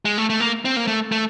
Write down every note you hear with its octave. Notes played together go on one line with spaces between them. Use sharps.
G#3
A3
A3
A#3
C4
A#3
A3
A3